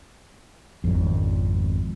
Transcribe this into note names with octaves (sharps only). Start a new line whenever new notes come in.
G#1 F2